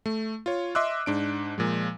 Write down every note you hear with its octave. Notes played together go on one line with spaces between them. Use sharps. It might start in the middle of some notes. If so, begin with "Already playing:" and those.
A3
F4 C#5
D#5 E5 C6 D6 E6 F#6
G#2 D4 D7
A#2 F3 G#3